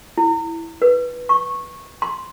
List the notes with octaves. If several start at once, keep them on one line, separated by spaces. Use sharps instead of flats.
E4
B4
C#6
C6